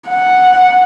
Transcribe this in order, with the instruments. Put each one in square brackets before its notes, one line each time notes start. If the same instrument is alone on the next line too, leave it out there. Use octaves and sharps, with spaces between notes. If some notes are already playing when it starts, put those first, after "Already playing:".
[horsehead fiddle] F#5